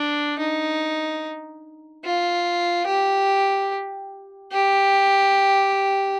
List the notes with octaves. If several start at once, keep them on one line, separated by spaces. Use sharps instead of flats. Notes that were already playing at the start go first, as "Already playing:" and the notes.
Already playing: D4
D#4
F4
G4
G4